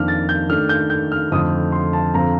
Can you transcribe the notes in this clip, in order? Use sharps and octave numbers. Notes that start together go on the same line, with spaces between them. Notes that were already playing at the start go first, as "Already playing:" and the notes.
Already playing: F2 D#3 A#3 D4 F6
A6
G6
D#3 A3 D4 F6
G6
G6
F6
F2 D3 A3 D#4 D#6
C6
A5
F2 D3 F3 C4 A#5